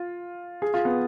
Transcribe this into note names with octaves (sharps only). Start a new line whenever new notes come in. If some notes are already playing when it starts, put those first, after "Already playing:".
Already playing: F4
G#4
F4
B3